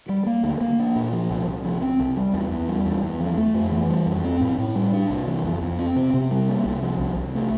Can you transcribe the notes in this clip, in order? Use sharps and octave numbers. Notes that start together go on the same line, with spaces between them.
G3
A#3
D2
A#3
D4
A#2
F3
C2
C2
F3
C4
C2
G3
E2
E2
G3
E2
E2
F3
A3
F2
E3
G3
F2
C4
A2
A2
G3
D4
C2
E3
F2
F2
C4
C3
C3
G3
A#3
C2
F3
C2
C2
A3